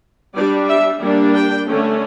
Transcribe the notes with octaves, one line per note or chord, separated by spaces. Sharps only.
G3 D4 D5
E5
G3 A#3 D4
G5
D3 A3 C#4